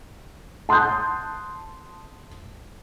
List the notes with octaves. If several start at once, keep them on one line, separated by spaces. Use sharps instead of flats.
A5 C6 D#6 F#6 G6